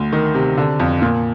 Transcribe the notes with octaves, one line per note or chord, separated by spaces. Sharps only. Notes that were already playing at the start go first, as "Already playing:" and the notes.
Already playing: D2
D#3
C3
D3
F2
A#2